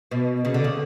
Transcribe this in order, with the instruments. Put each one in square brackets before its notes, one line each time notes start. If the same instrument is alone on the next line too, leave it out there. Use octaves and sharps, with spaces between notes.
[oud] B2
C#3
D3
C#3